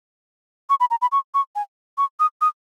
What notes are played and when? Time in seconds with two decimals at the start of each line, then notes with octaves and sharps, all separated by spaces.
0.70 C#6
0.80 B5
0.91 A#5
1.02 B5
1.12 C#6
1.34 C#6
1.55 G#5
1.98 C#6
2.20 D#6
2.41 D#6